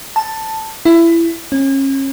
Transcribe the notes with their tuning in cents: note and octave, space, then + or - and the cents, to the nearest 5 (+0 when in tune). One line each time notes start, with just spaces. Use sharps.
A5 +10
E4 +20
C#4 -35